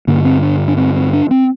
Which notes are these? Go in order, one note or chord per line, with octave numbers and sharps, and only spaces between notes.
G2 D3 A#3
C4
D4
D4
C4
C4
D4
C4